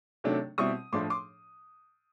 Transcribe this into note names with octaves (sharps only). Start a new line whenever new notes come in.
C3 D#3 F#3 A3 D4
B2 G3 C4 E4 C#6 D#6
A2 F3 A3 D4 C6 D6
C6 D6